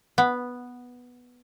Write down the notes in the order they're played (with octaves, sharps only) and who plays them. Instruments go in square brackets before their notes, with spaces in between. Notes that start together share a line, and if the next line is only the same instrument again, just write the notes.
[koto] B3